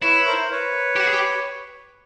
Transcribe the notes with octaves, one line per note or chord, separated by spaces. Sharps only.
E4 B4 C#5
B4
A#4 C5
B4 C#5
G4
F#4
G#4
G4